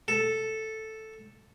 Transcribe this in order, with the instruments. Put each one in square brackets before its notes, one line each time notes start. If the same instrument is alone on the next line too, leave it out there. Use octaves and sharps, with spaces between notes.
[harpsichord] A4